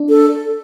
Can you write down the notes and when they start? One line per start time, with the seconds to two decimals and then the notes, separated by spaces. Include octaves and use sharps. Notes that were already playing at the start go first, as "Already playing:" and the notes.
Already playing: D4
0.09 A4